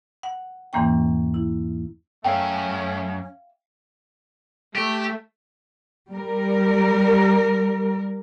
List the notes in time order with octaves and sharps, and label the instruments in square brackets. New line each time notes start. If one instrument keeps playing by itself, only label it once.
[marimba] F#5
E2 G#2 E3 A#3 C#4 G5
E4
[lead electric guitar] F#2 [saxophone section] A3 [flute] C#4 [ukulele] E5 F5 G5
[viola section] A3 [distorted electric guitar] G4
[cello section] G3 A#4